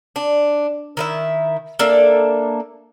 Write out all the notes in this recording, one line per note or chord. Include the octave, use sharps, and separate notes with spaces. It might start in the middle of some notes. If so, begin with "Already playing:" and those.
D4
D#3 E4 E5
A#3 D4 A4 E5